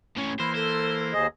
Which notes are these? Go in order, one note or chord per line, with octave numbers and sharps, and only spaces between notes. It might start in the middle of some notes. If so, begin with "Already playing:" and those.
A2 C#4
E3 A#3 C5 B5
A4 C5
D#2 G#4 D#5